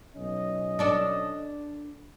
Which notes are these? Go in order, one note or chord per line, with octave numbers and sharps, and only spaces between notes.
B1 C#4 D#5
D4 A4 D5